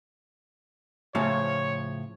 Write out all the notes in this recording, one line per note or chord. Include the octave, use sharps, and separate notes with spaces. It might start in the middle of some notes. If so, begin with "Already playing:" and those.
A2 C#3 F3 C#5